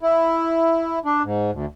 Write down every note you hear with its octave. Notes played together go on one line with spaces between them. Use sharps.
E4
D4
G#2
D2